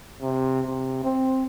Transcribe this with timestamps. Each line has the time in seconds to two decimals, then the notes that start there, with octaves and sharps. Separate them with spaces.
0.22 C3
0.67 C3
1.04 C4